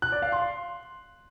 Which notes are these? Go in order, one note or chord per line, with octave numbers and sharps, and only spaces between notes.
F#6
D5
F5
C6